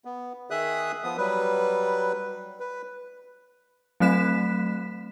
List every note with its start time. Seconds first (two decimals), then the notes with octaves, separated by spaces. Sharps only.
0.05 B3
0.51 D#3 G#4 E5 D#6 F#6
1.04 F3 B3 D#6
1.18 F#3 G3 B4
2.60 B4
4.00 F#3 A3 C4 F#6 B6 E7